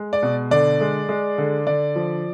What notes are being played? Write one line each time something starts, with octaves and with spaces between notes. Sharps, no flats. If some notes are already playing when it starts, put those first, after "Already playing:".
Already playing: G#3
D5
B2
D3 D5
G#3
G#3
D3
D3 D5
F3